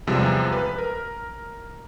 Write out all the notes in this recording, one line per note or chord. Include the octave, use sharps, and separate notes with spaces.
E2 C3 F3 G3 G#3
B4
A#4